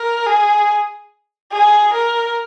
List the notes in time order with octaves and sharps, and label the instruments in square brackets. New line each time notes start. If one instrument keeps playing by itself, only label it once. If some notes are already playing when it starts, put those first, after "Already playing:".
Already playing: [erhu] A#4
G#4
G#4
A#4